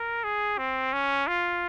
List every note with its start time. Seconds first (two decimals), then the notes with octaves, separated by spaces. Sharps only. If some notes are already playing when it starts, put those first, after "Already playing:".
Already playing: A#4
0.24 G#4
0.58 C4
0.93 C#4
1.28 F4